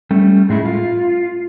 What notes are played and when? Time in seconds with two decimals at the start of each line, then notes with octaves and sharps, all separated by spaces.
0.11 G3 A3 C#4
0.49 A2 G#3 A3 E4
0.66 F4